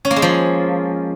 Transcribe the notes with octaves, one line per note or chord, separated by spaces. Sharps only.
C#4
A#3
G#3
F3